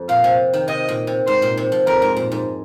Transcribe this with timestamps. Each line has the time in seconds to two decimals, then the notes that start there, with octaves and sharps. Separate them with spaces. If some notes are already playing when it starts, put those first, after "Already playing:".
Already playing: F2
0.09 A#2 F5
0.24 C3
0.53 D#3
0.68 C3 D#5
0.89 A#2
1.07 C3
1.27 G#2 C5
1.42 A#2
1.57 C3
1.72 F3
1.87 F2 A#4
2.02 G#2
2.16 A#2
2.32 G#2